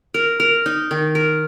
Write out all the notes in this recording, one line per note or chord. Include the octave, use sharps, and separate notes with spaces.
A#4
A#4
D#4
D#3
A#4